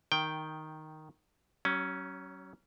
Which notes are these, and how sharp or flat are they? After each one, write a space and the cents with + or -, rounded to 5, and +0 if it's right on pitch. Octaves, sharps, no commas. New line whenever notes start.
D#3 +0 G5 +0
F#3 +35 C#4 +0